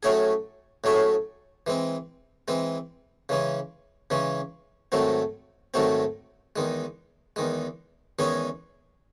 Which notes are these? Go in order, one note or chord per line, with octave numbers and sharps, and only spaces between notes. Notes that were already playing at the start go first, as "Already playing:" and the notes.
A2 F#3 A3 C#4 G#4
A2 F#3 A3 C#4 G#4
E3 G#3 C4
E3 G#3 C4
C#3 E3 G#3 C#4
C#3 E3 G#3 C#4
G#2 D#3 F#3 A3 C4
G#2 D#3 F#3 A3 C4
E2 D#3 G#3
E2 D#3 G#3
E2 D#3 G#3 C#4 G#4